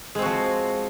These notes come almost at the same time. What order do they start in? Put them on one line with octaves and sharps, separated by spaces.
G#3 C4 F#4 F3